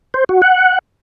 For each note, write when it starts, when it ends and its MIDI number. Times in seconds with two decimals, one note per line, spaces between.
0.14 0.24 72
0.29 0.41 66
0.42 0.79 78